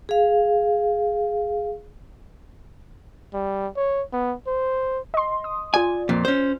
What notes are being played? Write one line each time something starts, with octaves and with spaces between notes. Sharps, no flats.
G#4 F5
G3
C#5
B3
C5
D#5 C6
D#6
F4 D5 G#5
F2 A#2
C#4 C5